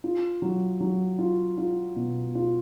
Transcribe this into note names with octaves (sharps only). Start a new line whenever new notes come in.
F4
F#3
F#3
F4
F4
B2
F4